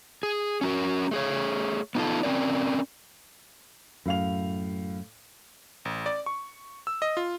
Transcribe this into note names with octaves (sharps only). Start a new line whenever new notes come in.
G#4
C#4 F#4 A#4
A3 G#4 C#5
B3 D#4 F4 A4
C4 C#4 A#4 D5
F#2 A2 F5 F7
A1
D5
C#6
E6
D#5
F4